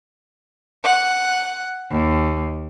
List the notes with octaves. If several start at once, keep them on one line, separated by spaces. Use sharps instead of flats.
F#5
D#2